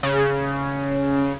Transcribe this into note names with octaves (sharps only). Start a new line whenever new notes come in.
C#3